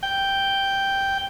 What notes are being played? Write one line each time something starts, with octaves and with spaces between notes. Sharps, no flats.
G5